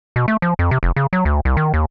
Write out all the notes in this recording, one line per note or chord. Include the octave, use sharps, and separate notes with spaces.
B2
A3
F3
F2
C3
F1
C#3
F#3
D2
C2
D#3
D#2